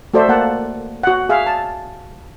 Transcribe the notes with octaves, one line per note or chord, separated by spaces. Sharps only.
A3 F#4 A4 C5 D5 E5
A#3 F#5 A5
F#4 F#5
G#4 E5 F5
A5